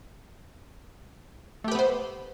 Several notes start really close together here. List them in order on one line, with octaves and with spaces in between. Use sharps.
A3 G4 B4 B3 C5